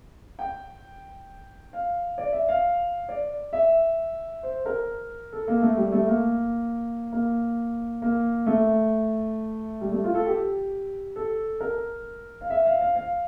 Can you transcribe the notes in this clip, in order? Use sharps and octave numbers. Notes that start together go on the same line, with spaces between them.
G5
F5
D5
E5
F5
D5
E5
C5
A#4
A4
A#3
A3
G3
A3
A#3
A#3
A#3
A3
G3
A3
F4
A4
G4
A4
A#4
F5
E5
F5
F5
F5